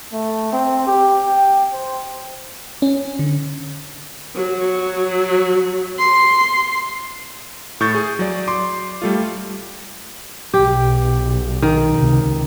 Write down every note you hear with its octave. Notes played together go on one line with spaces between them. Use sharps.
A3
C4
G4
G5
C5
C#4
D3
F#3
C6
A2 C#6 G6 A6
G#4
F#3 D5
C6 D6
G3 A3 F4
B1 G4
D#3
C#2 C3